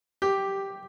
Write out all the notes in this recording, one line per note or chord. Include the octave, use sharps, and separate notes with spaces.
G4